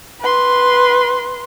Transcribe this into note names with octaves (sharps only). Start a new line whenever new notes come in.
B4 C6